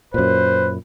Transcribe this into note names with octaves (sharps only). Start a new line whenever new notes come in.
F#2 A#2 B4 C5